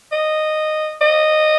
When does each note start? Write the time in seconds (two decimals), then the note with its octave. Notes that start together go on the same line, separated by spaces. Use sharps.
0.12 D#5
1.01 D#5